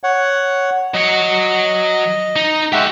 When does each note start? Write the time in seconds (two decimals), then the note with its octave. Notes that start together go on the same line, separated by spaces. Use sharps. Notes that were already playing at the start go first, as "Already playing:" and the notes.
0.03 C#5 F#5
0.94 F#3 D#5 F#5
2.36 D#4
2.72 G#3 F#4 G4 E5 F#5